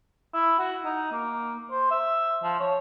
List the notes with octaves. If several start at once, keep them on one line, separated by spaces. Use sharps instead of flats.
E4
F#4
D#4
A#3
C5
E5
F3
C#5